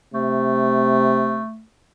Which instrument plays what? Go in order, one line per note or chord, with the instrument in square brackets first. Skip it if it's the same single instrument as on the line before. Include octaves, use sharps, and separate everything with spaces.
[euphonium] C3 [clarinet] A3